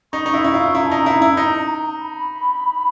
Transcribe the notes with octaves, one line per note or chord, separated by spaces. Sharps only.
D#4 C#6
D#4
E4
E4 C#6
F4
E4 A#5
A5
D#4 A#5
E4
E4
D#4
B5